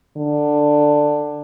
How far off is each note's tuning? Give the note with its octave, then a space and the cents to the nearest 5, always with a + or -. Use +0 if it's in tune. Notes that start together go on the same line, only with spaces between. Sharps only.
D3 +10